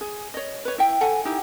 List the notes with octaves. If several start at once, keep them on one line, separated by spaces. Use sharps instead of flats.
G#4
C#5 D#5
B4 C#5
E4 E5 G5
A4 F#5 G#5
D#4 E4 G4